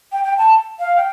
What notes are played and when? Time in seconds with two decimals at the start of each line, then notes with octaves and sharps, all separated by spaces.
0.12 G5
0.24 G5
0.37 A5
0.79 F5
0.96 G5